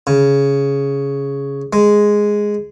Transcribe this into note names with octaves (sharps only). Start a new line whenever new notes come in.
C#3
G#3